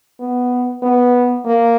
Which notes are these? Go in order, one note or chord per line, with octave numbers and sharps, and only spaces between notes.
B3
B3
A#3